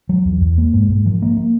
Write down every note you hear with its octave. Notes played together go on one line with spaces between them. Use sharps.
F#3
E2
E2
A#3
G#2
G#2
F3
A#3
A#3